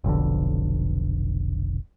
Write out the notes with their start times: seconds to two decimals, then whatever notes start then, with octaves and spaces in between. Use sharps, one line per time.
0.04 F1 B1 F2 D3